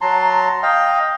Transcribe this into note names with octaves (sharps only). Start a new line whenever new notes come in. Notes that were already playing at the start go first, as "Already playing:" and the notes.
F#3 A5 A#5 C6
D#5 F5 G5